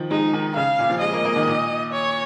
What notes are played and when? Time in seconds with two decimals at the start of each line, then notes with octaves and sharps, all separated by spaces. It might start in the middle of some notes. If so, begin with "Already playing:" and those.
Already playing: D#3 F3
0.10 G#3 D#4
0.33 D#3
0.56 C#3 F5
0.79 A#2
0.90 F3
1.01 G#3 D#5
1.13 A#3
1.25 A#3
1.36 D#3
1.47 A#2
1.93 C#5